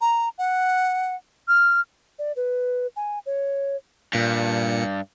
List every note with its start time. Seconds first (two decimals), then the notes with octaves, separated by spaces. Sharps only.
0.01 A#5
0.38 F#5
1.48 F6
2.19 D5
2.36 B4
2.96 G#5
3.26 C#5
4.13 G2 A#2 C#7